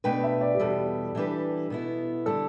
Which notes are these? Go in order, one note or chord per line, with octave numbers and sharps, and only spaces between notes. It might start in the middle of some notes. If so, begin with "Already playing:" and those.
B2 A3 D4 B4 G5
E5
D5
G4
E2 B2 G3 A4
E3 G3 D4 G4 B4
B2 B3 E4
D3 G3 D4 A4